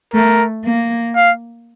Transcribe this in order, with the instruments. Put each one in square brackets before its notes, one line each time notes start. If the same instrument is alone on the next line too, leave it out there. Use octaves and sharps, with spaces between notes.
[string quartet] A3 [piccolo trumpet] A#4
[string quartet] A#3
[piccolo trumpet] F5